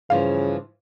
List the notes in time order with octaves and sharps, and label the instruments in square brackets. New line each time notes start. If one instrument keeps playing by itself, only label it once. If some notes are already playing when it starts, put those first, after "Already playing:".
[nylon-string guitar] G2 E3 F3 [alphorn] C#3 [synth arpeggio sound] F5